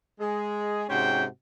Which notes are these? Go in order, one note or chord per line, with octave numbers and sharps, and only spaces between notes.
G#3 G#4
G#2 C3 C#4 F#4 C5 G5